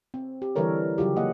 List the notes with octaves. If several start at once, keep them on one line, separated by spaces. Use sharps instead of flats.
C4
G4
D3 E3 G3 A4 A#4 C#5
C#3 F#3 F4 G4
A#3 G#4 D#5 F#5